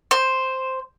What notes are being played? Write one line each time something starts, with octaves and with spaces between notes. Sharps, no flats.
C5